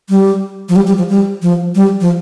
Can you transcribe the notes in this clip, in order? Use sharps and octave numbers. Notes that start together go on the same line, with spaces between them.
G3
F3
G3
G3
F3
G3
F3
G3
F3